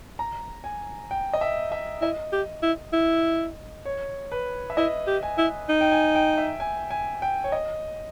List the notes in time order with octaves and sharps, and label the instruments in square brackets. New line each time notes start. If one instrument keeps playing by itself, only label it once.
[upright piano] A#5
G#5
G5
D#5
E5
E5
[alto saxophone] E4 [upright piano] D#5
[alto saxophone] G4
E4
E4
[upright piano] C#5
B4
E5
[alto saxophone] E4 [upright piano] D#5
[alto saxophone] G4
[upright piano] G#5
[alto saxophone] E4
D#4
[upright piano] G5
G#5
G5
E5
G#5
G#5
G5
C#5
D#5